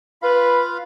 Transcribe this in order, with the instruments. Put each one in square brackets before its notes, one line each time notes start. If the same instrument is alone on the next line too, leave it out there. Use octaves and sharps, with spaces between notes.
[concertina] F4 F5 [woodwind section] B4 B5